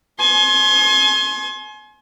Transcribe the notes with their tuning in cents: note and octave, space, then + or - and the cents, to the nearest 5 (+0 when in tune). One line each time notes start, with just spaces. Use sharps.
G#5 +35 C6 +35